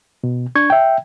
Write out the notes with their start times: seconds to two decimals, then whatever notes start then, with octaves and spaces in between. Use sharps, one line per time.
0.24 B2
0.55 D4 C#6 G#6
0.70 E5 G5